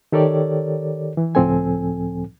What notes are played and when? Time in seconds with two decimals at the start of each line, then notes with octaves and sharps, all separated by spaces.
0.12 D#3 G4 A4 A#4 C#5 D5
1.17 E3
1.35 C#2 A2 F3 C4 A4 G#5